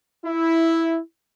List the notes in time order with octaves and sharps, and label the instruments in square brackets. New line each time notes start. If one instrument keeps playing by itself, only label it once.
[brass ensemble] E4